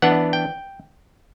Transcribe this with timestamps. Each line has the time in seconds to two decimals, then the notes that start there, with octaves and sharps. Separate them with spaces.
0.02 E3 B3 D4 F#5
0.33 G5